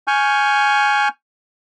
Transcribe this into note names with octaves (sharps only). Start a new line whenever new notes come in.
G#5 C#6 F6 G6